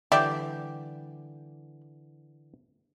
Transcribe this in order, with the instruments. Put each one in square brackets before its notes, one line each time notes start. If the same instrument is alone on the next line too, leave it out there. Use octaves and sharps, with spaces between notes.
[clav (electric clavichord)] D3 E3 [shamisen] G3 G4 [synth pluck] D5 E5 [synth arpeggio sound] D6 G6